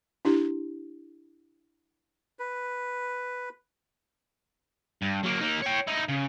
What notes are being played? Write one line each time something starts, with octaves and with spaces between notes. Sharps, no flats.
D4 E4 G4
B4
G2
F#3 A#3
A#3 D#4
C#5 G5
D#4 E4
C#3